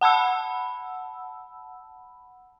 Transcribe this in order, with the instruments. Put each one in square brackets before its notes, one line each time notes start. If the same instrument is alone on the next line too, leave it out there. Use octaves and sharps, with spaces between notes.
[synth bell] F#5 A5 B5 E6